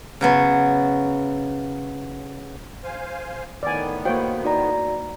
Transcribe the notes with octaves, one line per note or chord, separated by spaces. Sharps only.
C#3 F#3 B3
C5 F5 G#5
A2 D#3 B3 D5 G#5
A#3 F#4 C5 C#5 F5 G5
D#4 F#4 D5 A#5